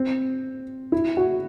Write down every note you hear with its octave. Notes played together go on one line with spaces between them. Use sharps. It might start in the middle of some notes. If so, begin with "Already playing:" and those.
Already playing: C4
E4
F#4